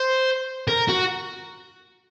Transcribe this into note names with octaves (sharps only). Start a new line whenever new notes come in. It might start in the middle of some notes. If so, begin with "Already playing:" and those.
Already playing: C5
A#4
F#4